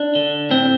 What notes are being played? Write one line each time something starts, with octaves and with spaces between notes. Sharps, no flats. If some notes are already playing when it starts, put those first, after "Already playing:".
Already playing: D4
D3
A2 C4